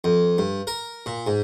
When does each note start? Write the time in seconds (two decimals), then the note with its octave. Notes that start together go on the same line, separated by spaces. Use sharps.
0.04 F2
0.38 G2
0.67 A#4
1.06 A#2
1.27 G#2